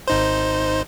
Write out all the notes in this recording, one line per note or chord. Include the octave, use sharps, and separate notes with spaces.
G#1 D#4 C5